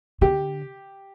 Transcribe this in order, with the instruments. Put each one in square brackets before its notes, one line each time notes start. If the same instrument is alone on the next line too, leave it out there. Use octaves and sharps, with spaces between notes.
[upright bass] D3 [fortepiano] G4